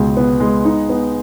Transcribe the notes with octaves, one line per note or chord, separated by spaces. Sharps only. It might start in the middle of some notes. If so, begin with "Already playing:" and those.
Already playing: C#2 B2 G#3
B3
G#3
D#4
B3